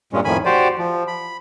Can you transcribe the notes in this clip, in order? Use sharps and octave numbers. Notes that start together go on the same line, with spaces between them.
G2 A#2 G#3 C#4
F2 A2 D#3 G#5 B5
F#4 G4 C5 D5
F3
B5